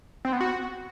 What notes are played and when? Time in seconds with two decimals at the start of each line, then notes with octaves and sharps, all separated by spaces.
0.25 C4
0.33 B3
0.41 F#4